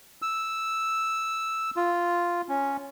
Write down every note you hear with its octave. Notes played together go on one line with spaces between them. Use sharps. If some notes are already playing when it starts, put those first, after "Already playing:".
E6
F4
C#4